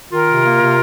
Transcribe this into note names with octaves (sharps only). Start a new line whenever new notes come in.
D#3 F4 A#4
C3
A#3
C3